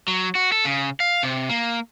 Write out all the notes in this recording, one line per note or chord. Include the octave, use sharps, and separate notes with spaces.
F#3
F#4
A4
C#3
F5
C3
A#3